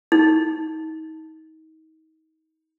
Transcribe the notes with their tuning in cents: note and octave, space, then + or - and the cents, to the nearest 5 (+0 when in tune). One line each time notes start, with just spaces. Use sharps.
D#4 +35